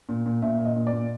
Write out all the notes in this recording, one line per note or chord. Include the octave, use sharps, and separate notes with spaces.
A#2
A#2
A#2 E5
A#2
D#5
A#2
D5
A#2